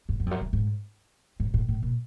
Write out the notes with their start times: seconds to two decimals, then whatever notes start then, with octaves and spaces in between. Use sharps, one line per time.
0.09 F#2
0.20 F#2
0.26 F2
0.31 F#2
0.41 G2
0.53 G#2
1.40 G#2
1.54 A2
1.68 A2
1.82 A#2